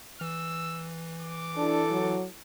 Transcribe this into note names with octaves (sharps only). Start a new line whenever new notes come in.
E3 E6
D6
D4 E4 A4
F#3